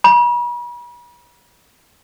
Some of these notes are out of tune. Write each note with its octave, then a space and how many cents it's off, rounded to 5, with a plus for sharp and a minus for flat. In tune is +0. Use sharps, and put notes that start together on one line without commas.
B5 -40